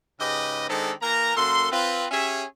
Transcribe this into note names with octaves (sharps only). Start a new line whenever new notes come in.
G#2 C#3 G4 B4 D#5
D#3 G#3 C4 D4 A4
E3 A#3 A#4 A#5
F#2 A#3 A4 C6
C4 F4 B4
C#4 G4 G#4 C#5 E5